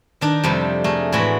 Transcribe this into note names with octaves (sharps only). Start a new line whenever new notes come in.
D#3 D4 D#4
F2 C3 G3 A3
A3 G#4 A#4
A2 E3 G#3 F#4 E5 B5